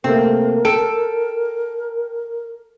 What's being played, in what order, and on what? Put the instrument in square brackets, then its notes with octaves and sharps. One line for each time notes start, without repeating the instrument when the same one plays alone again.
[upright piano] C3 A3 A#3 [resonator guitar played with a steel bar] C4 [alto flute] A#4
[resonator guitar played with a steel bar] A4 [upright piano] G5 D7